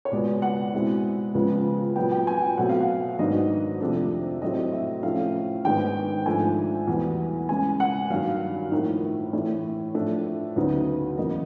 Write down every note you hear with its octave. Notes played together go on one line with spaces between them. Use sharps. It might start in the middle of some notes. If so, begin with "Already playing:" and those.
C#5
C#2 B2 G#3 B3 D5
F#5
B2 G#3 C4 E4
C#2 C#3 F3 G#3 B3
A#2 F#3 B3 G5
G5
G#5
G5
B2 F#3 A3 C4 F#5
F5
F#5
G#2 D#3 F#3 B3 D4 D#5
F2 C3 F3 A3 D4
A2 F#3 A3 C4 D#5
E5
A2 F3 A3 C#4 F5
G#2 D#3 G#3 B3 D4 G5
G#2 F3 A3 D4 G#5
E2 B2 G3 B3
C#3 E3 G#3 C#4 G#5
F#5
G2 D#3 F#3 F5
A2 F3 A#3 D#4
A2 E3 A3
A2 F3 A3 D4
D2 C#3 F#3 B3 D#4
E2 C#3 F#3 A#3 D#5